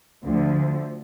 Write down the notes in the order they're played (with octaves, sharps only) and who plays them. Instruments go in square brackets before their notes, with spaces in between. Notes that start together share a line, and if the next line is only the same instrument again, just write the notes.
[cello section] D2 D3 F3